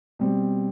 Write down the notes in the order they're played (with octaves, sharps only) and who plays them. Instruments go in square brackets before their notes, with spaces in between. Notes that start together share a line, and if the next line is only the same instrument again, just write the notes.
[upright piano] B2 G3 C4